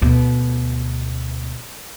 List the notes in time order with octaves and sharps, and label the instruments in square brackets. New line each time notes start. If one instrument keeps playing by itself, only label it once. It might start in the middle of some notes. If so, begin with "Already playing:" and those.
[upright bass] D2 B2